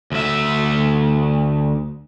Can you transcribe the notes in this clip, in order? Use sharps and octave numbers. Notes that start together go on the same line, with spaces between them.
D2 E5